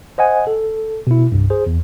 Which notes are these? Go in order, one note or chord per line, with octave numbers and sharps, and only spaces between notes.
C5 D#5 F#5 G#5
A4
B2 E4
C2 G2
G#4 C5
E2